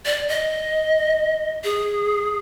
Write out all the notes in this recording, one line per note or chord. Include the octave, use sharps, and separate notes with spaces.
D5
D#5
G#4